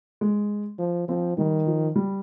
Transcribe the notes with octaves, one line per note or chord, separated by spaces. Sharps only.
G#3
F3
F3 C4
D#3 G3
F3
G3